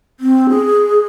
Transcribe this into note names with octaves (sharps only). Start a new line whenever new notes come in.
C4
G#4